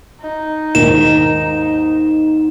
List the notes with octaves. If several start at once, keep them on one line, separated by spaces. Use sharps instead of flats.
D#4
D#2 G#2 E7